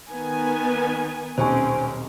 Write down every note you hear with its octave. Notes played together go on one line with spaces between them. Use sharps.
D#3 B3 G#5
D#1 B1 C4 C#4 C5 G#5 C#6